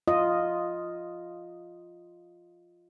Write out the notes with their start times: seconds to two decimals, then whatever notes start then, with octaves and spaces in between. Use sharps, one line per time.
0.08 F4 D#5